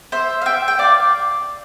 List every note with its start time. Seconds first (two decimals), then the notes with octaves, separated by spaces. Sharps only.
0.12 C5 E5
0.42 F5
0.46 E5 G5
0.68 G5
0.79 D5 F5